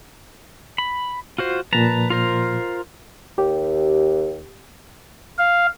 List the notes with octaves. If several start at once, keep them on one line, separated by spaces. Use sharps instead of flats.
B5
F4 F#4 C5
A#2 F3 B4 A5 A#5
F4 A#4 C5
D#2 G4
F5